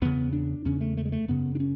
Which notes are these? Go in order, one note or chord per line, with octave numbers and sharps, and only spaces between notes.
E2 C#3 B3
D4
E2 C#3 C#4
A3
A3
G#3
A3
F#2 C#3 B3
D4
C#4